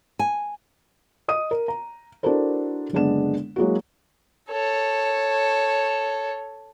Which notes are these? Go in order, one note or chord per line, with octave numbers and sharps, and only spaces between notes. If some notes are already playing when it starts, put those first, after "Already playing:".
G#5
D#5 D#6 D#7
A#4
A#5
D4 E4 F#4 A4 A#4 C5
F#1 D3 G#3 B3 D4 E7
F#3 G#3 A#3 E4 F#4
A4 C#5